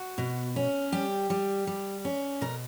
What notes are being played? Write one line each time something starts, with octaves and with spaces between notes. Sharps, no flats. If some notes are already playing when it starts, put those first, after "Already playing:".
Already playing: F#4
B2
C#4
G3 G4
G3
G3
C#4
B2 A#4